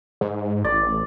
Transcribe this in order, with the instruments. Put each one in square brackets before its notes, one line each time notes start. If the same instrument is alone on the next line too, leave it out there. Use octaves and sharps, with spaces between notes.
[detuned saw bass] G#2
[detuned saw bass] A1 [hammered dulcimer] D5